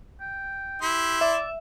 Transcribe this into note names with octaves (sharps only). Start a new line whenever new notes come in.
G5
E4 G4 C6
D5 E5